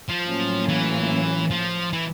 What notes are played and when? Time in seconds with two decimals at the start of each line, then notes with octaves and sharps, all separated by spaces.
0.09 F3
0.27 A2 F#3 A#3 C#4 F4
0.69 E3
1.51 F3
1.93 E3